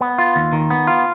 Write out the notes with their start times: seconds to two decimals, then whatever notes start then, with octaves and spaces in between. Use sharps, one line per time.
0.01 B3
0.18 F4
0.36 D#2
0.53 D#3
0.70 B3
0.87 F4